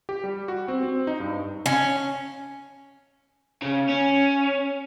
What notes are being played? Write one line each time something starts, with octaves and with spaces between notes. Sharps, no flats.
G4
G3
F#4
C4
C4
D#4
G2
C#4
C#3
C#4